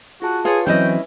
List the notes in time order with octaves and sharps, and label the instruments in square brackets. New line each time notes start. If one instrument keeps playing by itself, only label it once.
[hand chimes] F4 G#4 A5 [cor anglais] F#4
[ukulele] F4 C#5 [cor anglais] G#4 [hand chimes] B4
[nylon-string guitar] E3 F#3 C4 [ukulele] C#4 E4 D#5 [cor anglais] G5